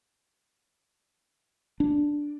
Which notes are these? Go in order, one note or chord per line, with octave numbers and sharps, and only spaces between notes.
D4